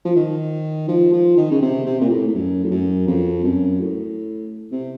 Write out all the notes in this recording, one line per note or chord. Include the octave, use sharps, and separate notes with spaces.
F3
D#3
F3
F3
D#3
C#3
C3
C3
A#2
A2
A2
F#2
A2
F#2
F2
F#2
A2
C3